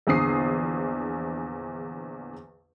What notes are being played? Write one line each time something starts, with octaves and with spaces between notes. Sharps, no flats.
A#1 E2 D3 D#6 C7